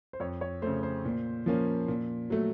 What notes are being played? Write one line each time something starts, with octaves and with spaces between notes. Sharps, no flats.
C5
F2 C#5
C#5
C#3 A3 C5
C5
A#2
F3 A#3 C#4
A#2
F#3 A3